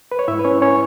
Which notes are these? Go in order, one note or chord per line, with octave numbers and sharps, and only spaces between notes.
B4
C#5
G#2 G#3 E4 E5
B4
C#4 C#5
C#4 C#5